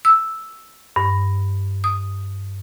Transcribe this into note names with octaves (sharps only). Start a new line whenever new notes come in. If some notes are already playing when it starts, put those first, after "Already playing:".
E6
G2
D#6